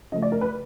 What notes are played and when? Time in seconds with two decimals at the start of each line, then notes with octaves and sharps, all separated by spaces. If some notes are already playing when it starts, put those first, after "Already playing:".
0.12 C#3 F3 A3 D#5
0.22 D5
0.32 A#4
0.41 B4